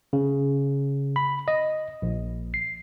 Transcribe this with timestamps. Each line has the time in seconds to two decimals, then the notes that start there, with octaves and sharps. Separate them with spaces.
0.13 C#3
1.16 B5
1.48 D#5
2.02 A#1
2.54 C7